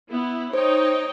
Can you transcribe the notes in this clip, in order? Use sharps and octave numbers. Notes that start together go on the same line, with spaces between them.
B3 E4
D#4 C5 C#5 G5